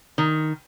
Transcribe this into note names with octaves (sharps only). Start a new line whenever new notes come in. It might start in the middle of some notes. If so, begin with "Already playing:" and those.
D#3